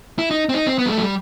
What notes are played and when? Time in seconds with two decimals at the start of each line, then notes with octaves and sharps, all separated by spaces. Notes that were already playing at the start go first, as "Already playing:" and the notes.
0.19 E4
0.31 D#4
0.49 C4
0.54 D#4
0.67 C4
0.78 B3
0.86 G3
0.90 A3
0.98 F#3
1.02 G3